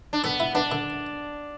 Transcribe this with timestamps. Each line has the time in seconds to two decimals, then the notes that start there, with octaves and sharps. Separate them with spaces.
0.13 D4
0.24 B3 A4
0.40 E4
0.55 B3 D4
0.72 D3